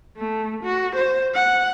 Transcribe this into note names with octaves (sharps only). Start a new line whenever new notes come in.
A3
F#4
C5
F#5